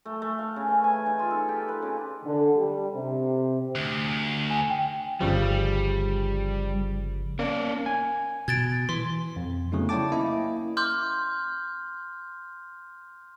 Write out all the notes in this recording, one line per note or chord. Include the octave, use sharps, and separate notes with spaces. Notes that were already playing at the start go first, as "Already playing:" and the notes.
A3
A3
F5
C#3
E3
G#5
D#4
F4
A4
G4
B4
C#3
D3
G3
C3
D2
G#5
G5
G1 C#3 F3 G3
A#3 C#4 D5
G#5
B2 G#6 A6 D7
E3 C6
F2
C#3 F#3 A3 B3 D#4
E4 C#5 D5 G5 A5 D6
A#3 C#4 E4 D#5 F5
C6 D6 F6 G6